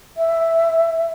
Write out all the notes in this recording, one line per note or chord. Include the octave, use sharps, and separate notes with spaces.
E5